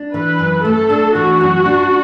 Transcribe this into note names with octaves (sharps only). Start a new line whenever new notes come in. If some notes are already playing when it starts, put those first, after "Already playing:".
Already playing: D4
E3 B4
F#2
A3 A4
D4
E3 F#4
F#2
D4